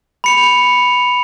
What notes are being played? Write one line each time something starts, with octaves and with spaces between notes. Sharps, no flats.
B5 C#7 F7